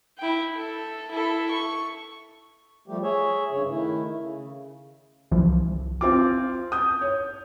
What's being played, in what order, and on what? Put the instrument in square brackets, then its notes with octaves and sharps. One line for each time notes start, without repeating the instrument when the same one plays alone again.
[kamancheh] E4 G5
A4
E4 A4
C#6
[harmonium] F3 G3 A3 G4
G#4 C#5 E5
G2 C#3 C#5
D#3 A3 E4
C#3
[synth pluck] C2 E3 F3
G1
[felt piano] C4 F4 D6
D#6 G6
C#5